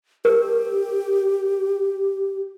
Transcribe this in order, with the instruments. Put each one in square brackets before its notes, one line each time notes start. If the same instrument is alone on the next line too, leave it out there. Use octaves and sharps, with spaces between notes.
[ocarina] G4 [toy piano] A#4